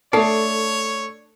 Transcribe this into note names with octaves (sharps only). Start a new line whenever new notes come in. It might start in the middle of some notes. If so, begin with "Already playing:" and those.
A3 D4 A4 C#5 A5 C7